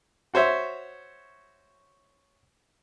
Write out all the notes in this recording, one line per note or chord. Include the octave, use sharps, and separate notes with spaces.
F#4 C5 C#5 E5